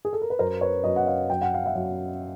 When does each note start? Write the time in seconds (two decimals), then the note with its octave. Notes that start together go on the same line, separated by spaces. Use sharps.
0.05 G#4
0.13 A4
0.22 A#4
0.30 B4
0.39 F#2 A#4 C5
0.61 B4 C#5
0.84 F#2 C#5 D#5
0.96 F#5
1.06 D#5 F5
1.30 F#2 G5
1.41 F#5
1.54 F5
1.66 E5 F#5
1.75 F#2